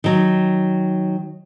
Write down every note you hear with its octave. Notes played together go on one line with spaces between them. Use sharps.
D#3 F#3